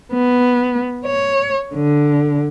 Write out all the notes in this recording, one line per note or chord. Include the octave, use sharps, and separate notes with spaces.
B3
C#5
D3